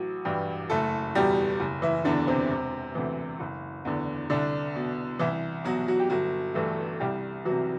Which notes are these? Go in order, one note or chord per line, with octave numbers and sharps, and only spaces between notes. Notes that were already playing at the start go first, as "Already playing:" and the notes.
Already playing: A1 F#3 F#4
G2 E3 G3 G4
F#1 A3 A4
E2 B2 G3 G4
F#1
E3 E4
E2 D3 D4
C3 C4
E1
D2 C3 E3
F#1
E2 D3
C2 D3 D4
B2
C2 E3 E4
B2 F#3 F#4
F#3 F#4
G4
G1 F#3 F#4
G2 E3 A3 A4
C2 G3 G4
C3 E3 F#3 F#4